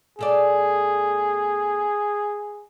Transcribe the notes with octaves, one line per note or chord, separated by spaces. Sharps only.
B2 A3 G#4 D5